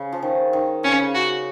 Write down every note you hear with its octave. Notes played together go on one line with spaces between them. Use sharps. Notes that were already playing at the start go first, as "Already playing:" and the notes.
Already playing: C#3
F3
D#3
D#3
C#3 C#4
C#3
F#4